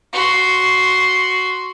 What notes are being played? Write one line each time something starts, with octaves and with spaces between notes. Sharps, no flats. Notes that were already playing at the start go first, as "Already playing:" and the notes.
F#4 C6